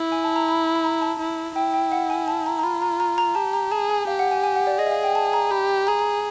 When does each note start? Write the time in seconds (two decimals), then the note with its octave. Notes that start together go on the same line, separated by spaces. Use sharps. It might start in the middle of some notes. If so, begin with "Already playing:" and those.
Already playing: E4
0.12 G#5
0.24 A5
0.36 A#5
0.48 B5
0.75 B5
0.84 A#5
1.02 A5
1.19 E4
1.55 E4 G5
1.74 G5
1.92 F#5
2.10 G#5
2.28 A5
2.46 A#5
2.59 A#5
2.63 F4 B5
2.82 A#5
3.00 A#5
3.18 A#5
3.35 G4 A5
3.53 A#5
3.72 G#4 A5
3.90 G#5
4.07 G4 F5
4.19 F#5
4.31 G#5
4.44 G#5
4.55 F#5
4.67 D5
4.79 G#4 D#5
4.86 E5
4.92 F5
5.03 G5
5.15 A5
5.33 A#5
5.51 G4 B5
5.87 G#4 A#5
5.99 A#5